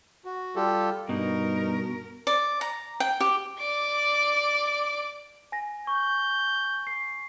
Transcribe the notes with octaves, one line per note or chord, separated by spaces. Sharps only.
F#4
G3 F4 G4 A4
G2 B2 D#4 A#4
D5
A#5
G5
G4
D5 D6
G#5 A#6
C#6 G6
C7